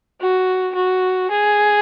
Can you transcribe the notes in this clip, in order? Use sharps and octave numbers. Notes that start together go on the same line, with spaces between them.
F#4
F#4
G#4